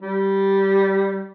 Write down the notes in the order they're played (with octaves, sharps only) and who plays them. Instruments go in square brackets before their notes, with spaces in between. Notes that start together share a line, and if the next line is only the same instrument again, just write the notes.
[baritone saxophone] G3